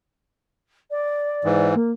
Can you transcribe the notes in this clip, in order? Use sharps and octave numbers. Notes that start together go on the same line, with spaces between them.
D5
G#2 E3
A#3